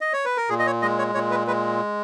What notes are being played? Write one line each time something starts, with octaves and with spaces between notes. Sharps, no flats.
D#5
C#5
B4
A#4
A#2 G#4
D#5
C#5
G#3 D#5
C#5
A#2 C#5
B4
G#3 B4